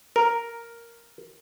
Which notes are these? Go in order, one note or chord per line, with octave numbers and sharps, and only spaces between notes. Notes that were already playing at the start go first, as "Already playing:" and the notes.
A#4